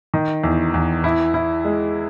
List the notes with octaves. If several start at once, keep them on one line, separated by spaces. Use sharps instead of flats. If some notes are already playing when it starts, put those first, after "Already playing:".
D#3
E2
E2
E4
E4
G#3